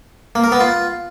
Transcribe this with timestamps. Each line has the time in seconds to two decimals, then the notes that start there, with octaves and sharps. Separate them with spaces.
0.35 A#3
0.44 A#4
0.52 B3
0.60 F4